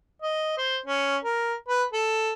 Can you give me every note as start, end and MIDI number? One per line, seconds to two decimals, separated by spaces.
0.22 0.56 75
0.58 0.78 72
0.86 1.17 61
1.24 1.54 70
1.68 1.83 71
1.93 2.33 69